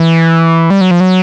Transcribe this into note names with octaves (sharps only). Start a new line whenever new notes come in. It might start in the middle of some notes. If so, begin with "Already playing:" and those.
Already playing: E3
G3
F#3
F3
F#3